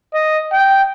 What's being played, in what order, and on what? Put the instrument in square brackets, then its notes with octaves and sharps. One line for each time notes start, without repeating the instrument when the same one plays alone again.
[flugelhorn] D#5
G5